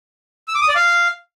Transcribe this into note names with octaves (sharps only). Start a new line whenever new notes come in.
E6
D6
D#6
D5
F5